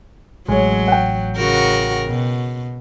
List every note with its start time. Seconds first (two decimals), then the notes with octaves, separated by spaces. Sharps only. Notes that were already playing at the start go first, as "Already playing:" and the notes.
0.48 A1 F#3 G#3 C#5
0.88 F#5 G5
1.37 C#3 F#4 A#4
2.07 B2